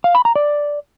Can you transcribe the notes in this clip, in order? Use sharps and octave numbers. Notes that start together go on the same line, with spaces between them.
F5
B5
A#5
D5